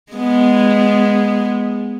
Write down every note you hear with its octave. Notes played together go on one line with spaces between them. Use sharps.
G#3 B3